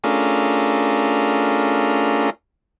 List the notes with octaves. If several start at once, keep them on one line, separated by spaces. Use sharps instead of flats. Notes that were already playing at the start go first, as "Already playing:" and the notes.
A3 C#4 D4 F4 G#4 A#4